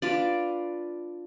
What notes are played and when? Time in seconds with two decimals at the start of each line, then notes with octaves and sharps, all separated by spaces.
0.02 D4 F4 B4 D5